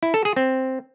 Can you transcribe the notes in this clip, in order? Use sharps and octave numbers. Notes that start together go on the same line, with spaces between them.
E4
A4
G#4
C4